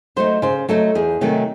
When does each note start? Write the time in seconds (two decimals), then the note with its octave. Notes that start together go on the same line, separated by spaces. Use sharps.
0.16 F#3 A3 D#4 C5
0.42 C#3 C5
0.69 F#3 A3 D#4 A4
0.95 E2 G#4
1.21 C3 D#3 F#3 A3